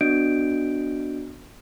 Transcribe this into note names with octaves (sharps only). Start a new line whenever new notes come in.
B3 D4 F#4 D#5 G6 D7